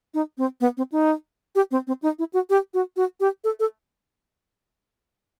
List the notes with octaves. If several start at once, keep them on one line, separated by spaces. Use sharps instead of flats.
D#4
C4
B3
C4
D#4
G4
C4
C4
D#4
E4
F#4
G4
F#4
F#4
G4
A4
A4